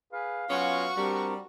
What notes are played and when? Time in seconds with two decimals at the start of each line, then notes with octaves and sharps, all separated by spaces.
0.13 G#4 B4 F5
0.50 F#3 B3 C#4 F4 F#4 G#5 C#6
0.97 G3 C4 D4 A#4